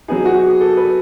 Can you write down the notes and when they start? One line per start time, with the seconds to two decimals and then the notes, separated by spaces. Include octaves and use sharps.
0.08 F#3 B3 D#4 G#4
0.25 F#4
0.43 G#4
0.61 A4
0.77 B4